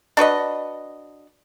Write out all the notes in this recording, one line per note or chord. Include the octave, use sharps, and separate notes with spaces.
D4 F#4 B4 D#5